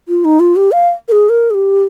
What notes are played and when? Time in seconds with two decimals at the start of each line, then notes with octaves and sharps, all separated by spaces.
0.08 F4
0.25 D#4
0.40 F4
0.56 G4
0.72 F5
1.08 A#4
1.12 G#4
1.29 A#4
1.51 G#4
1.54 G4